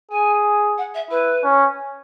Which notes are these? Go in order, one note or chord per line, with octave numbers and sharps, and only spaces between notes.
G#4 G#5
F#5
E5
E4 B4
C#4